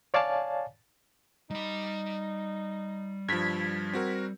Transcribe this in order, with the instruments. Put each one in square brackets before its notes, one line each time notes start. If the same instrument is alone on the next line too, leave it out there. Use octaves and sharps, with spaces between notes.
[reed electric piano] C#5 D5 F5 G#5 A5
[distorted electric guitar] G3 B5 [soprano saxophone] D#4
[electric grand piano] G2 F3 [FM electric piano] G#6 B6
[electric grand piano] C4 F#4 A#4